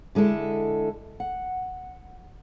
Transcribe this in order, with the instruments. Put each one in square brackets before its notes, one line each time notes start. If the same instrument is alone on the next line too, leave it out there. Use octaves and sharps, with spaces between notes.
[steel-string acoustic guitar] D3 G#3 E4 A4
F#5